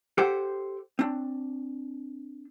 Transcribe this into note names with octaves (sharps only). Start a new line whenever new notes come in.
G4 A4 C5 F#5 G5
C4 D4